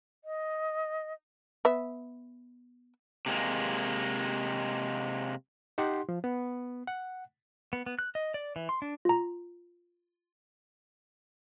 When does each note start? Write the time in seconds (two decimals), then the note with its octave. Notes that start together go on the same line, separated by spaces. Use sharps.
0.24 D#5
1.65 B3 E5
3.26 C3 G#3 A#3
5.78 D#4 G4 F#5 C6
6.09 F3
6.24 B3
6.87 F#5
7.73 B3
7.86 B3
7.99 F#6
8.15 D#5
8.34 D5
8.56 E3
8.69 C6
8.82 D4
9.05 F4 A#5